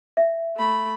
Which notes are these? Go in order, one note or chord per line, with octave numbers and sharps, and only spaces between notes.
E5
A3 B5